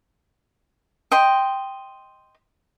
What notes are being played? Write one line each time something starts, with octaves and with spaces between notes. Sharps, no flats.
D#5 G5 C6